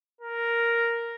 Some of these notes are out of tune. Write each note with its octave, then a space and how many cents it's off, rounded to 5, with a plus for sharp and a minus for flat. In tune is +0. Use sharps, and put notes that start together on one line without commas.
A#4 +0